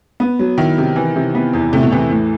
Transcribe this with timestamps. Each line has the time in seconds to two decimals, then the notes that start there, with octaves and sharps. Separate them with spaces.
0.20 B3
0.39 F#3
0.58 D#3 E4
0.78 C3
0.96 E3
1.16 C3
1.35 B3
1.53 E2
1.73 C3 A3
1.83 B2
1.91 C3 E3
2.10 A2